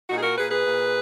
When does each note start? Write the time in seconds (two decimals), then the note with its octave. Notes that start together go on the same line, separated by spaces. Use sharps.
0.09 A#2 D#4 F#4
0.17 G#4
0.23 F#4 A#4
0.37 A#2 G#4 B4
0.50 G#4 B4
0.64 A#2